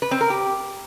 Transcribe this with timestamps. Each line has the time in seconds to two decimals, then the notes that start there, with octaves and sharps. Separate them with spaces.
0.02 B4
0.11 C4
0.21 A#4
0.30 G4